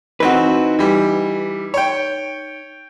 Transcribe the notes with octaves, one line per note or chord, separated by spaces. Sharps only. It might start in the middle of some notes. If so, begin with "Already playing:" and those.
E3 C4 D#4 F#4 B4
E3 G3
C#5 G5